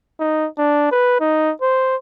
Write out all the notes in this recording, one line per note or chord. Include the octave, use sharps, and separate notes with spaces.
D#4
D4
B4
D#4
C5